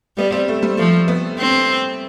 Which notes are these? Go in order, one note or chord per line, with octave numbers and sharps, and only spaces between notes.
G3 B3
C4
A3
G3
F3 A3
B3
C4